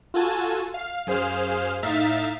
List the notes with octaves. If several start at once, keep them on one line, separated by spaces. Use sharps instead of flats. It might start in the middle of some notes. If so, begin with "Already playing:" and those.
F4 F#4 A4 G#5 A5
F5
F#2 G#4 C5 F5 F6
A2 D#4 E5 F5 A6 B6